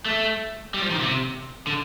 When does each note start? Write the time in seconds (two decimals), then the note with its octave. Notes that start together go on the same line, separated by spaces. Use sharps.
0.06 A3
0.74 G3
0.82 F3
0.90 D#3
0.99 C3
1.67 D3